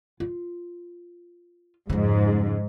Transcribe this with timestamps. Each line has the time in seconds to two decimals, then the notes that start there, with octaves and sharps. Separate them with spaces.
0.20 F4
1.90 F2 G#2 C#3